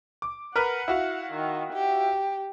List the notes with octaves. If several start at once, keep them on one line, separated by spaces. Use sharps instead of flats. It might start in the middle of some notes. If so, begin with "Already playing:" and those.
D6
A#4 B4 F#5 F6
E4 F#4 F5
D#3
G4